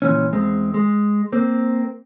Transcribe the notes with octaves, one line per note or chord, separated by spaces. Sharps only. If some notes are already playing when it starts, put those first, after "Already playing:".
C#2 A#2 E3 C#4
E2 G#3 C4
G#3
A#3 C4